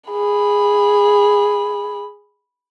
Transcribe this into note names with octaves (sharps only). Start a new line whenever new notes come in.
G#4 B5